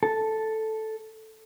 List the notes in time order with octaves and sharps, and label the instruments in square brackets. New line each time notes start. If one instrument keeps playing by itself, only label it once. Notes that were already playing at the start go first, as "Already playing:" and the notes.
[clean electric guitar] A4